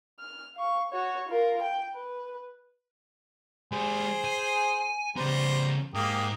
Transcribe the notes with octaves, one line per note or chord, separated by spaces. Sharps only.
F6
F5 C#6
F#4 C#5
F4 A#4
G5
B4
G#3 G4 G#4 C5
G#5
C#3 G3 B3 C5 A#5
G#2 A#3 G4 D#6